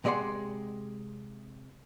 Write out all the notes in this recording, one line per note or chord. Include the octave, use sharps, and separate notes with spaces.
C3 G#3 D5 D#5 F#5 C6